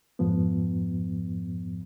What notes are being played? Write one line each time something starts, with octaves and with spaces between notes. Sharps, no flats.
F2 G#2 F3 B3